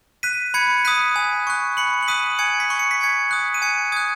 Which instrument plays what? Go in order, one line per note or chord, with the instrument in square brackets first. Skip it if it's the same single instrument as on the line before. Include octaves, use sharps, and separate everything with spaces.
[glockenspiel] F#6 B6 D#7
B5 G#6 C#7
D#6 F#6 B6 D#7
G#5
C#6 F#6
B5 C#7 F#7
F#7
D#6 F#6 B6 D#7
G#5 G#6 C#7
B6
C#6 F#6
C#7
B6
G#5 G#6 C#7
D#6 F#6
D#7
G#5 G#6 C#7
D#6 G#6
F#6